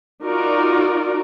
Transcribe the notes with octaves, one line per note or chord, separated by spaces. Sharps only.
D#4 F4 F#4 A#4 D5